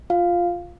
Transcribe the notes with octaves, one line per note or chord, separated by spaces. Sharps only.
F4 F5